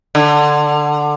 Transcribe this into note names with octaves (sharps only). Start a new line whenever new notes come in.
D3